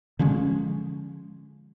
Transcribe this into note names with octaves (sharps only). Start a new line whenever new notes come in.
D3 F3 G#3 C#4